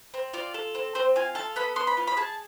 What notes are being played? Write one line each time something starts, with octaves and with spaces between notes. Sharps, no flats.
C4
F4 D5
A4
C4
C4 C5
F4 G#5
A4 A5
B3 B5
B3 C6
B5
F4
B5
G#4 A5